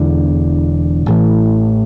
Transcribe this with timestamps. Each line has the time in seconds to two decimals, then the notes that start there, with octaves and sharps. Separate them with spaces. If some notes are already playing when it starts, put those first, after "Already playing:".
Already playing: E1 E2 D3
1.06 A1 A2 E3